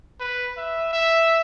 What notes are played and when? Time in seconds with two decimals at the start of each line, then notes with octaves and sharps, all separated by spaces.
0.20 B4
0.57 E5
0.93 E5